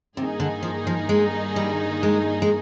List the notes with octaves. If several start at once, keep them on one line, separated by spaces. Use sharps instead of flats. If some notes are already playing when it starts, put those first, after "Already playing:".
G2 C3 D#3 A#3 D#4 G#4
D3
F3
F3
G#3
G3
G#3
G#3